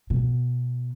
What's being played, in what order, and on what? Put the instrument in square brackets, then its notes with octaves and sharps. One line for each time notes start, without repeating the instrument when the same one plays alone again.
[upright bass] B2